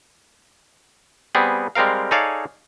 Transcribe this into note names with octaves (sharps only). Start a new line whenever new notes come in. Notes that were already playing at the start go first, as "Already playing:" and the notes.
G3 B3 C4 G#4
G3 G#3 C4 A#4 F5
D#4 G#4 A4 C#5 D5 F5